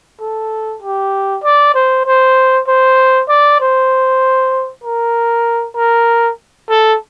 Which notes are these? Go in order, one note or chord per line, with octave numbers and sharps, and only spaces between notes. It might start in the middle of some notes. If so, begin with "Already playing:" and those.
A4
G4
D5
C5
C5
C5
D5
C5
A#4
A#4
A4